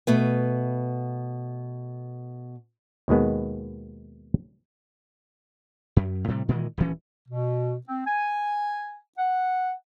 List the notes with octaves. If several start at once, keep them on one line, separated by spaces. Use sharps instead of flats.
B2 A3 B3
D#2 B2 D#3 G#3 B3
F#2
A2 C3 G3
A#2 D#3 E3 G#3
D#1 D2 E3 C#4
B2
C4
G#5
F#5